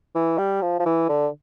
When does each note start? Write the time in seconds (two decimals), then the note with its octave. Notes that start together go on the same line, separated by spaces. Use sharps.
0.15 E3
0.38 G3
0.62 F3
0.79 F3
0.86 E3
1.09 D3